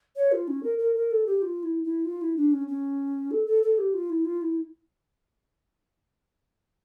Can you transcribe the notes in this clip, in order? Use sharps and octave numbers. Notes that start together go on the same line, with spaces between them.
C#5
F4
C#4
A#4
A#4
A#4
A4
G4
F4
E4
E4
F4
E4
D4
C#4
C#4
A4
A4
A4
G4
F4
E4
F4
E4